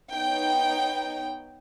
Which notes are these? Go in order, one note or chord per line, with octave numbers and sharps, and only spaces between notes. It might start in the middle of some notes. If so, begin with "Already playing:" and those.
B3 D#4 C#5 G5